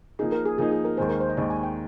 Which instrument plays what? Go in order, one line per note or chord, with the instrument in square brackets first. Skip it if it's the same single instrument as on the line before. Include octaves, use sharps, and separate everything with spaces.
[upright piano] F3 A#3 D#4 [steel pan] G#4
[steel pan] A#4
G#4
[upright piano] F3 A#3 D#4 [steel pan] G#4
[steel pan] G#4
A#4
[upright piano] D#2 D#3 G#3 [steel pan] C5
[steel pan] A#4
C5
D#5
[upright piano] D#2 D#3 G#3 [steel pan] D5
[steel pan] G#5
G5